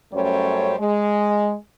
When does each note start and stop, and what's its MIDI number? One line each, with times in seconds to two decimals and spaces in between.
0.13 0.74 42
0.13 0.74 55
0.13 0.74 57
0.13 0.74 61
0.13 0.74 72
0.13 0.74 73
0.79 1.54 56